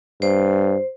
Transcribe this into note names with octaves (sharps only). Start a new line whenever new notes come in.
G2 C5